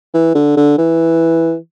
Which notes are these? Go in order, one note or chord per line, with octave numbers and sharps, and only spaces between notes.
E3
D3
D3
E3